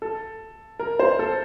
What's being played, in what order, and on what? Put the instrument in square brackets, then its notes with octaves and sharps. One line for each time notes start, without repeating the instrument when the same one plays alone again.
[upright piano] A4
A#4
C5
A4